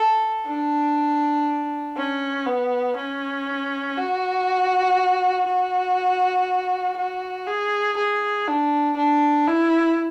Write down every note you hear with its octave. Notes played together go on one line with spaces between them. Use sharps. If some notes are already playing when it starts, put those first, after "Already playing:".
Already playing: A4
D4
C#4
B3
C#4
F#4
F#4
F#4
G#4
G#4
D4
D4
E4